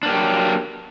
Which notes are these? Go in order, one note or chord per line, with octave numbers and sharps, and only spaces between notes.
F#3 A#3 D4 G4